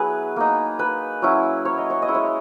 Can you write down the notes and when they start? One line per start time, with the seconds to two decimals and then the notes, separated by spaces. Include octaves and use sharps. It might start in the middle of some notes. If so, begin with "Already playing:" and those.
Already playing: F#3 B3 E4 G#4 B4
0.36 A#3 D#4
0.79 B4
1.22 F#3 C#4 E4
1.65 C#5
1.78 D#5
1.90 C#5
2.02 D#5
2.08 G#3 C#4 E4
2.15 C#5